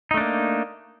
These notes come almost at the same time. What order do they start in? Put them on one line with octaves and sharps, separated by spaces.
D#4 A3 D4 A#3